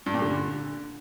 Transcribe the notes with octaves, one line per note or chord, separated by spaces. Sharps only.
G2
A#2
D3